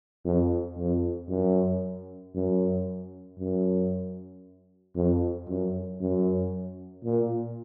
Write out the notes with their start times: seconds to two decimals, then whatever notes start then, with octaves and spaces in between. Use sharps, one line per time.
0.25 F2
0.78 F2
1.29 F#2
2.35 F#2
3.39 F#2
4.95 F2
5.48 F#2
6.01 F#2
7.04 A#2